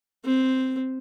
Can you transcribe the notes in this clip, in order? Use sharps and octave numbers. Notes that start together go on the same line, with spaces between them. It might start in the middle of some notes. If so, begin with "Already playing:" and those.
C4